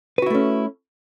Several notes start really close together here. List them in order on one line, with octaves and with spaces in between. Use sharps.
B4 F#4 E4 A3 C#4